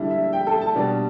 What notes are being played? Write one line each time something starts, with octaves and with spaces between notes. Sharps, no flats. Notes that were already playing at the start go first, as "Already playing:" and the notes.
Already playing: D3 G3 E4
E5
G5
A4
A5
B2 G3 B3 D4